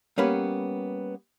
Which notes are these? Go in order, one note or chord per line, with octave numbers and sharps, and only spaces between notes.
G3 A#3 B3 C#4 B4